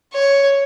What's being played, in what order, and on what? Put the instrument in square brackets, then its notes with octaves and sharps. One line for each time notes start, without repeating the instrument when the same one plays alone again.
[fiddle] C#5